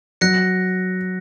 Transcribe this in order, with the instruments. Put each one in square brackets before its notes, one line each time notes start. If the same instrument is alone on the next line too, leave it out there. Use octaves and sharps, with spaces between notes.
[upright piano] F#3 [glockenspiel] F#6 A#6 C#7